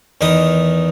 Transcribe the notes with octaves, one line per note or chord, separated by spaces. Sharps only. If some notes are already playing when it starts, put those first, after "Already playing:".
E2 D#3 D#4 B4 D#6